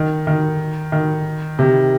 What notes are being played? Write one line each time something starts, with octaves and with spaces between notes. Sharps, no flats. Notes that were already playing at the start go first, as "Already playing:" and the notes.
Already playing: D#3
D#3
D#3
C3